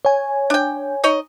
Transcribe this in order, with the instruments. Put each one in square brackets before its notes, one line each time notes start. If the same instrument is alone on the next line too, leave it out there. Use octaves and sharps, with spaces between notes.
[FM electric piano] C#5 G#5
[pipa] D4 G5
D#4 C#5 D#5